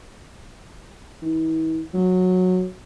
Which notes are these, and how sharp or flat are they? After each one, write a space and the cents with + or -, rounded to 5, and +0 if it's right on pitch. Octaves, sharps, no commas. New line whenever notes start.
E3 -45
F#3 -15